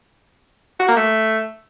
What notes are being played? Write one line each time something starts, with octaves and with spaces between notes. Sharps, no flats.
F#4
A#3
A3